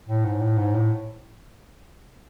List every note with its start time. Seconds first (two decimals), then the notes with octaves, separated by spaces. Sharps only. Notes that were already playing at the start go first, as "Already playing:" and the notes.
0.08 A2
0.25 G#2
0.41 A2
0.57 G#2
0.74 A2